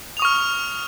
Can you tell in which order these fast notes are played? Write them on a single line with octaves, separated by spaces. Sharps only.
F7 D#6 C#6 F6